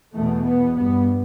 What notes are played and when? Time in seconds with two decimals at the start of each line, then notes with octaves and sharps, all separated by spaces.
0.15 E2 B2 A3
0.46 B3
0.76 G2 B3